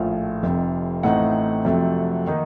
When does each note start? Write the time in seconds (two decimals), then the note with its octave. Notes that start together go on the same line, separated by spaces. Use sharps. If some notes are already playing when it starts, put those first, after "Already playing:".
Already playing: A#1 A2 F3 A3 F5
0.43 F1 F2 C3
1.03 A1 A2 A3 C4 D#4 F#5
1.65 F2 C3 F#3 A3
2.27 D#3 A#3 D#4